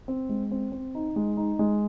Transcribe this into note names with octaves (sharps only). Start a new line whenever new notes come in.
C4
G#3
C4
C4
D#4
G#3
D#4
G#3